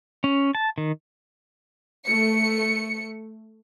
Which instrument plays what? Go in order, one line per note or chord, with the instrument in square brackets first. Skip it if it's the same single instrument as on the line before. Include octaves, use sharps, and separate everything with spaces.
[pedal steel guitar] C#4
A5
D#3
[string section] A3 C#7